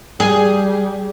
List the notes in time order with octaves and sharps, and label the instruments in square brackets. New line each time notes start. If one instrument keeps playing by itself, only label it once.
[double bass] G3 [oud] G#4